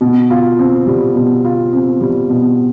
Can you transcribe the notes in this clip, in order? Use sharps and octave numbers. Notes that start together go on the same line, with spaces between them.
B2
F4
C4
G3
B2
F4
C4
G3
B2